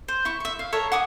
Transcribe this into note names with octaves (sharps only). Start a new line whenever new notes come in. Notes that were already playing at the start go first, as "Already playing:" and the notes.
C5
E4 C#6
E5 C#6
F5
A4 A#4 C#5 E5
F#5 G#5 D6 D#6